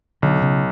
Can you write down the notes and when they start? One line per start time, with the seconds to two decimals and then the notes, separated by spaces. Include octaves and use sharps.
0.22 B1 D3
0.42 C#3